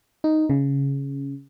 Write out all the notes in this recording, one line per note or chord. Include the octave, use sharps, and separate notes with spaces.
D#4
C#3